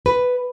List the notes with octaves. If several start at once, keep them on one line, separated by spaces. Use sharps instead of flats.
B4